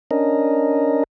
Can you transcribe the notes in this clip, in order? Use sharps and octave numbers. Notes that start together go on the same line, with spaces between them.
C#4 D4 A#4 D#5